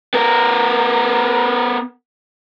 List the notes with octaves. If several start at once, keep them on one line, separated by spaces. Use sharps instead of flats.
B3 A#4